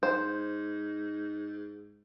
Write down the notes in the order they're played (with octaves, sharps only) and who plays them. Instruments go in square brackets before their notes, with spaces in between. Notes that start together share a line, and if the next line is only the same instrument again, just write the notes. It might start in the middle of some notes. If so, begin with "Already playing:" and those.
[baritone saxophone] G#2 [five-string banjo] C5